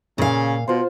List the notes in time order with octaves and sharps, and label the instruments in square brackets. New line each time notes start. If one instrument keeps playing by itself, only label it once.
[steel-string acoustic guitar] A#2 F5 [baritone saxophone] C#3
[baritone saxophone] B2 [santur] F4 C5